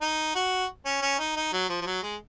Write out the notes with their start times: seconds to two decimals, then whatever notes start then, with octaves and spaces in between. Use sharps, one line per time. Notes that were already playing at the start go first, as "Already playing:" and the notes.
0.01 D#4
0.35 F#4
0.85 C#4
1.02 C#4
1.19 D#4
1.36 D#4
1.53 F#3
1.69 F3
1.81 F3
1.86 F#3
2.03 G#3